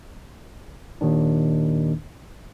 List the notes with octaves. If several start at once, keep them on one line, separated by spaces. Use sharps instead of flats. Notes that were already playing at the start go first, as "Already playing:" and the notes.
D#2 A#2 D#3 D4